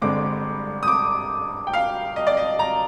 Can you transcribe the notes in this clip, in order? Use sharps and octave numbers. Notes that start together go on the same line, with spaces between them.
G1 G2 D3 G#3 C4 D6
D#6
D6
G5
F5
D#5
D5
D#5
A#5